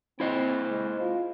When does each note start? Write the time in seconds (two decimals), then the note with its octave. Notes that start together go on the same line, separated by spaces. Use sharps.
0.20 C4 E4 C5 D#5
0.68 G#3
1.00 F4